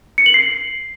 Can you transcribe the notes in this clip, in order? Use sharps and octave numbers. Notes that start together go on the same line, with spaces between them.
C#7
F#7
C7